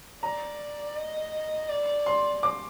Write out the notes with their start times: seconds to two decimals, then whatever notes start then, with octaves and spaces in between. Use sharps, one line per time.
0.23 D5 A#5
0.96 D#5
1.69 D5
2.06 C6
2.43 D6